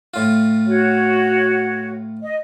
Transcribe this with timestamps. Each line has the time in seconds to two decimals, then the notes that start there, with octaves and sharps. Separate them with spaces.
0.14 A2 F4
0.66 F#4 C#5
2.21 D#5